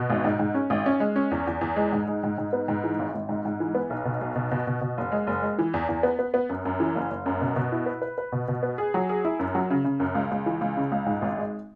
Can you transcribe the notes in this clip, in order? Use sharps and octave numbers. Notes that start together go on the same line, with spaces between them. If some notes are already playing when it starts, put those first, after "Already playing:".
Already playing: B2
G#1
G#2
G#2
C#4
G#1
C#4
G#3
C#4
E2
E2
E2
G#3
G#2
G#3
G#2
G#2
B3
G#2
E3
G#1
G#1
G#2
G#2
E3
B3
B1
B2
B1
B2
B2
B2
B2
F#1
G#3
F#1
G#3
E3
E2
E2
B3
B3
B3
F#2
F#2
E3
F#1
F#1
F#2
B2
B2
E4
B4
B4
B4
B2
B2
B3
G#4
F#3
G#4
E4
F#2
F#3
C#3
C#3
F#2
C#2
C#2
E3
C#2
C#3
C#2
G#2
G#1
G#3